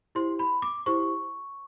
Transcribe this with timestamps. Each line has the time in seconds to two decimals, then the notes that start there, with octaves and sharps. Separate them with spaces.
0.15 E4 G4 C5 C6
0.39 B5
0.62 D6
0.86 E4 G4 C5 C#6